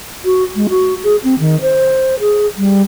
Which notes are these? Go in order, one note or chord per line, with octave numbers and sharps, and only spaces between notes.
F#4
G#3
F#4
G#4
C4
D#3
C5
G#4
G3